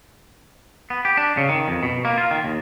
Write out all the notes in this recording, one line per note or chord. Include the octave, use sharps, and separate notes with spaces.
B3
G4
D4
C#3
D#3
F2
B2
A#3
F4
D#3
D#2